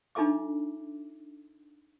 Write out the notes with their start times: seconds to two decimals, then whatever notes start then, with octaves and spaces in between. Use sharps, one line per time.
0.15 D4 D#4 F4 A4 E5 D6